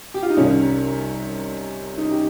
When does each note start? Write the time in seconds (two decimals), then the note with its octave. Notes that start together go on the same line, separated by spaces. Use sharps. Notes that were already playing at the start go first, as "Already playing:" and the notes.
0.14 G4
0.23 F4
0.30 D#4
0.37 C2 C3 D#3 C#4
1.98 D#4
2.11 G4